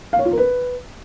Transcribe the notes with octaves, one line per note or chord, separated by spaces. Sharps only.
F5
C#5
F4
A#4
B4